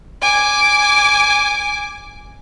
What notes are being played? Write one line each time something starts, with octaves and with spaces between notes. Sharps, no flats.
G#5 D6